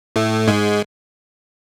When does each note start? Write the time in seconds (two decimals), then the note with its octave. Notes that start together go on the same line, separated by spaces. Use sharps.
0.16 A2 A3
0.48 G#2 G#3